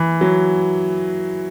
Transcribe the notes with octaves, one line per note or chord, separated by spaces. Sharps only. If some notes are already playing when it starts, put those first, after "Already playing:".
Already playing: E3
F#3